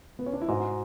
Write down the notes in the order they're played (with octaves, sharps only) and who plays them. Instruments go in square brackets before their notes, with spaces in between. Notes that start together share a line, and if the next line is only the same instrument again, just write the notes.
[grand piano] B3
C#4
D4
E4
[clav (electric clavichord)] G#2 [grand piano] F#4